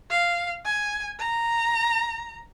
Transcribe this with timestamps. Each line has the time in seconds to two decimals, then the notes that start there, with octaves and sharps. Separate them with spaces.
0.11 F5
0.65 G#5
1.19 A#5